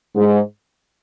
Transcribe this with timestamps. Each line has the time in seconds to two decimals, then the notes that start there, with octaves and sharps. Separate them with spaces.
0.16 G#2